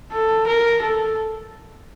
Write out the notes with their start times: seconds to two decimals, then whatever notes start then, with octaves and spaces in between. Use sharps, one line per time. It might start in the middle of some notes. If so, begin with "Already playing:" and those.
0.12 A4
0.47 A#4
0.82 A4